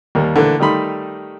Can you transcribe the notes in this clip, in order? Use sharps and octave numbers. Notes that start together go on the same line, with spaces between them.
D#2 G3 A#3
D3 E3 A3 A#3
D#3 G3 A3 D#4 B5 C6